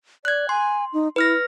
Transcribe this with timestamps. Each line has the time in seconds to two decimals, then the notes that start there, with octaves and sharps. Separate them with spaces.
0.25 D5 F#6 G#6
0.49 G#5 C6
0.93 D#4
1.16 E4 B4 F6 A#6